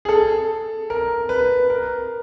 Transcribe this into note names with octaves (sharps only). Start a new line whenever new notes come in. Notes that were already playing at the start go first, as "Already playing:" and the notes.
G#4
A4
A#4
B4
A#4